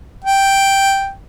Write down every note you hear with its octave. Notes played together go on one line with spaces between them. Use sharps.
G5